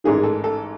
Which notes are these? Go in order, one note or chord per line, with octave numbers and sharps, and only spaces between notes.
A1 G#2 D#3 G#4
A4
A4